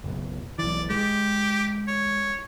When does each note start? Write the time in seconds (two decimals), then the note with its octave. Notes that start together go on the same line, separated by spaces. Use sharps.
0.04 F#1 B1
0.59 B1 E3 D5
0.90 G#3 G4
1.88 C#5